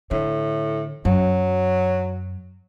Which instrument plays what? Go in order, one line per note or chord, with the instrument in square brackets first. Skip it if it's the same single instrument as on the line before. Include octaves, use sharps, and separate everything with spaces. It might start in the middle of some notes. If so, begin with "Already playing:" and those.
[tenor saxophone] A2 [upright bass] D3
[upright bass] F#2 [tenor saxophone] F#3